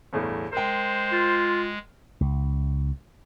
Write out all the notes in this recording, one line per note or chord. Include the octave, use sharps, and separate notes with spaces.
G1 E2 A2
G#3 A#4 C5 G5
F4
C#2